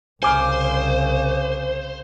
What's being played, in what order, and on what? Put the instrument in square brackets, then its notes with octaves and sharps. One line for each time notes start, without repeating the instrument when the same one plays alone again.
[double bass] C2 C#3 [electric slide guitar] C5 [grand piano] G#5 D6 F6